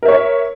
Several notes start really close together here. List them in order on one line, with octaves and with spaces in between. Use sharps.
A#4 E5 C#5